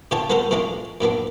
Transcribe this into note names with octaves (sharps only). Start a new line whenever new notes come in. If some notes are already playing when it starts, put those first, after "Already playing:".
B2 D3 F4 G4 C#5 A5
B3 C#4 F#4 A4 A#4 C5
B2 G#3 A3 C#4 D4 F4
F#2 A#2 B3 D4